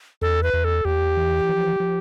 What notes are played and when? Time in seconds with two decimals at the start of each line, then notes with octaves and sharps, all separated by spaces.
0.22 E2 A4
0.43 B4
0.54 E2
0.64 A4
0.85 E2 G4
1.17 E3
1.49 F3
1.80 F3